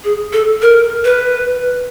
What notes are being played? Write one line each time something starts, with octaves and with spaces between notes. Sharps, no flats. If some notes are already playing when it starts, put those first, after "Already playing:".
G#4
A4
A#4
B4